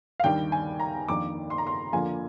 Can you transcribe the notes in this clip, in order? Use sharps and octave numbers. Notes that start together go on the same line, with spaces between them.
F5
D#2 D#3 G3 D4 G5
G#5
A#5
F2 D#3 A#3 D4 D6
C6
A#5
C6
F2 D3 F3 A#3 G#5